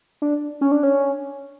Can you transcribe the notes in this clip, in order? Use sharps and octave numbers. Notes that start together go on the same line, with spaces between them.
D4
C#4
D4
C#4